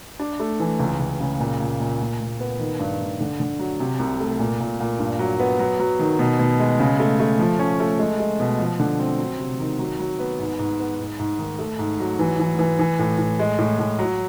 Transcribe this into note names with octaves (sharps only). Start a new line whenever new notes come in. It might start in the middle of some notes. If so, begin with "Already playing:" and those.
D4
A3
E3
C#2
C#2
C#3
A#2
A#2
A#2
A#2
A#2
B3
D#3
G2
D#3
D3
D3
F#3
C3
C2
A3
A#2
A#2
A#2
G2
F#3
B3
F#3
F#3
D#3
B2
B2
G#3
C#3
A3
A3
F3
C#4
A3
G#3
G#3
B2
F3
D3
C4
F#3
C3
D#3
F#3
F#3
B3
G#2
G#2
B3
G#2
G#2
D#3
A3
G#2
F#3
E3
E3
E3
E3
A2
A2
G#3
A2
A2
F#3